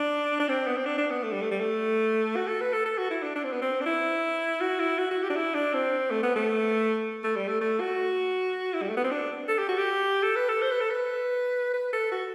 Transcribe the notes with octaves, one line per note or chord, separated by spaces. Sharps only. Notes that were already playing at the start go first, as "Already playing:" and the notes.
Already playing: D4
D4
C4
B3
C4
D4
D4
B3
A3
G3
A3
G3
A3
F#4
A4
B4
A4
A4
F#4
E4
D4
D4
C4
B3
C4
D4
E4
F#4
E4
F#4
F#4
G4
D4
E4
D4
C4
A3
B3
A3
A3
G3
A3
A3
F#4
E4
G3
A3
B3
C4
D4
A4
G4
F#4
G4
A4
B4
A4
C5
B4
A4
B4
B4
A4
F#4